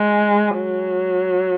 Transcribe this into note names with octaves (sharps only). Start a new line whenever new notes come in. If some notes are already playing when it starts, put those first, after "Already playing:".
Already playing: G#3
F#3